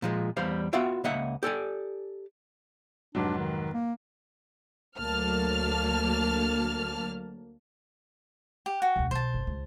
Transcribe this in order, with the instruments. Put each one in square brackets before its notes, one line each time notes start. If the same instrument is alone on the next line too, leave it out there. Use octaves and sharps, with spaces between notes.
[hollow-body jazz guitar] A#2 F3 G#3
E2 G3 C5 F5
B3 F4 F#4 E5 F5 G5
C#2 A#3 D#5 E5 F#5
G4 A4 D5 G#5
[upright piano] F1 G#2 F#3 [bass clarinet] D4
[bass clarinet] D#3
A#3
[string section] D2 F#3 A#3 A5 F6
[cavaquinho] G4
F#4 G5
[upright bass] E1 D2
[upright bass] B1 [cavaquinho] C5 A5
[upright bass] F#1
C#2